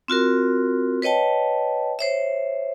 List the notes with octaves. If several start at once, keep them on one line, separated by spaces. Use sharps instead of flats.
C4 F4 F#4 A#4
B4 C#5 D#5 G5 A5
C5 C#5 E5